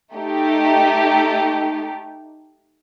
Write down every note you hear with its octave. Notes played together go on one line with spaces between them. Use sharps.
A3 D#4 G4